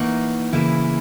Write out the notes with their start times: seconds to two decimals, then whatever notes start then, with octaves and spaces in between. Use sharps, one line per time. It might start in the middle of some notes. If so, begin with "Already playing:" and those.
Already playing: E3 A#3 D#4 F#4
0.52 C#3 E3 A#3 E4